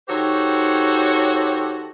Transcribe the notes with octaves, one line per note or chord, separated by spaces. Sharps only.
D#3 F#4 G4 A4 C5 C#5